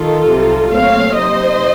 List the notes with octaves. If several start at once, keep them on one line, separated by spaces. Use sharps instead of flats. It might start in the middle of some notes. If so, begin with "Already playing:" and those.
Already playing: D#3 F4 A4
C2 C3 F#3 C4 D#4
A#2 F#3 A3 C4 C#5 F5
C3 F#3 A#3 D#4 C5 D#5